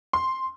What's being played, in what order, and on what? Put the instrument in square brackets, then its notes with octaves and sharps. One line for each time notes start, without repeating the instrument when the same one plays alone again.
[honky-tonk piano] C6